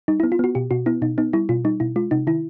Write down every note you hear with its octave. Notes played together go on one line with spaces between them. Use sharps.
G3 D#4
E4
B3
F4
B3 F#4
B2 G4
B2 F#4
B3 E4
B2 D#4
B3 D#4
G3 E4
B2 F4
G3 D#4
B2 E4
G#3 F4
C3 D#4
D#3 E4